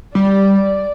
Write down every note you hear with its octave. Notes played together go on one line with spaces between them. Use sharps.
G3 D5